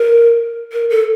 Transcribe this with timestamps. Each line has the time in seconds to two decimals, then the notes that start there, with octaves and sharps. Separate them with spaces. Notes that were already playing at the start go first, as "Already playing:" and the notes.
Already playing: A#4
0.73 A#4
0.90 A4